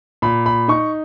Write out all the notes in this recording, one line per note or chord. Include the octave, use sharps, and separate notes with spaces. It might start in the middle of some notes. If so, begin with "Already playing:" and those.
A#2 B5
B5
D#4 C#6